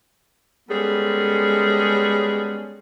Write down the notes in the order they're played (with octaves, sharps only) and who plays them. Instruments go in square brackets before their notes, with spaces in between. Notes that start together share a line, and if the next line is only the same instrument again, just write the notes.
[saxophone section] G3 G#3 B3 C#4 G#4 A4